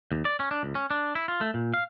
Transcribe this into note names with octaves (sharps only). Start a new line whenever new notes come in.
D#2
D5
C#4
D4
C#2
C#4
D4
E4
F4
A3
A#2
F5